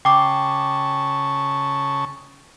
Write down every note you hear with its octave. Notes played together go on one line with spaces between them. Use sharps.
C#3 G5 A5 C#6 D6